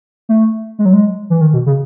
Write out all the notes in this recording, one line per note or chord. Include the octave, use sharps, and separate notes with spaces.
A3
G#3
F#3
G#3
E3
D#3
B2
C#3